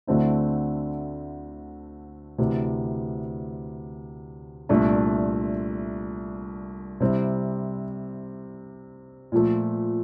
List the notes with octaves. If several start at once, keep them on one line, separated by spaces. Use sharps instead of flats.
D2 D3 A3 C4 E4
D2 C3 E3
C2 A#2 A3 D4
C3 G3 C4 E4
A#2 F3 A3